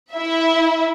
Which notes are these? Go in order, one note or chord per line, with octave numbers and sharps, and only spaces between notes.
E4 E5